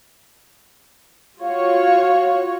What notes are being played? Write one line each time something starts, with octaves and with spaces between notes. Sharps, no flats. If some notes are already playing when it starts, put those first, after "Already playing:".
F4 F#4 C#5 F5